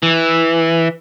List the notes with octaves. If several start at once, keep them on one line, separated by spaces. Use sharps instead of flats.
E3